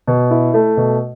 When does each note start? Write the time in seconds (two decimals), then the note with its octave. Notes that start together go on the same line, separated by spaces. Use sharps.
0.08 B2
0.31 E4
0.54 A3
0.77 B2